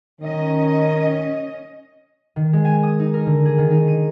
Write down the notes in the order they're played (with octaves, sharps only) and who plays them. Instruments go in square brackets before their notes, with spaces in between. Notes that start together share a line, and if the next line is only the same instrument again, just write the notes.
[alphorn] D#3 [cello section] C#4 D#5
[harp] D#3
G#3
G#5
D#6
D#4
A#4
D3
G#4
D#3
D#4
D#7